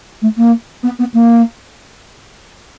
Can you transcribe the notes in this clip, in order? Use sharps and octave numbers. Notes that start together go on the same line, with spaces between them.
A3
A#3
B3
B3
A#3